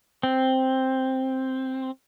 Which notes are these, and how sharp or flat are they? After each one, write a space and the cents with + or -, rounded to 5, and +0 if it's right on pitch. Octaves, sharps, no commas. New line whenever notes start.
C4 +5